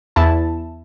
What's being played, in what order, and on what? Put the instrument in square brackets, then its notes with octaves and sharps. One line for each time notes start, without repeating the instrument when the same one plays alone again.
[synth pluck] E2 E4 A5